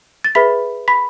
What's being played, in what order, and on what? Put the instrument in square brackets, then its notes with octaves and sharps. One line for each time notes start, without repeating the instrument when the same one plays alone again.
[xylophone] A6
G#4 B4 E5 B5 B6
B5 B6